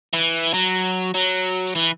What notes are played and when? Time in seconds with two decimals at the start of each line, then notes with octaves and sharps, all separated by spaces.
0.13 E3
0.54 F#3
1.15 F#3
1.75 E3